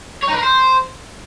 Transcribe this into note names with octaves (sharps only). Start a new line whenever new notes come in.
C#5
D#4
B4
A#4
C5